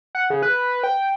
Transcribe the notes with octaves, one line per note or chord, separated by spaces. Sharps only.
F#5
C#3
B4
G5